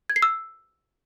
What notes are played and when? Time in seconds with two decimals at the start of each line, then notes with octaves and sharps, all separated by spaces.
0.10 G#6
0.16 C7
0.22 E6